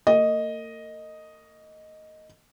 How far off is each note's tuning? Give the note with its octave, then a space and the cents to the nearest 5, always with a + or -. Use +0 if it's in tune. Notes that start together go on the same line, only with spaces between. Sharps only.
A#3 -40 D#5 +0